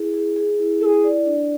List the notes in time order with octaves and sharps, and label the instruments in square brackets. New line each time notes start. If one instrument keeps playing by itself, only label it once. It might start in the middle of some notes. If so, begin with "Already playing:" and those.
Already playing: [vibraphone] E4 G#4
G#4
G#4
E4
[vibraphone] E4 [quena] G#4 A4
[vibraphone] D5
D4